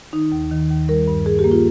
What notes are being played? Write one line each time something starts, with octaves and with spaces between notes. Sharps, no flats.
D#3 D#4
D#2
D#3
D#2
G3 A#4
G2
G2 G#4
G4
A#3
F4